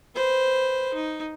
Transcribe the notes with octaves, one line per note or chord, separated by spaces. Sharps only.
B4 C5
D#4